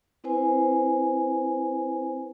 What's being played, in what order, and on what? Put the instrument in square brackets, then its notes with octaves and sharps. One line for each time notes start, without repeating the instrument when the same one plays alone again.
[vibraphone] C4 E4 B4 C5 G#5